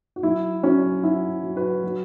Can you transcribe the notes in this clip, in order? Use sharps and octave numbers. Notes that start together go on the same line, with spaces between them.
F#4
F#3 E4
F#3 C#4 F#4
F#3 E4
F#3
F#4 B4
F#3